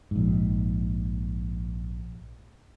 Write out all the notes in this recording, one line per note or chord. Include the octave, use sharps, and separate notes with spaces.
A#1 G#2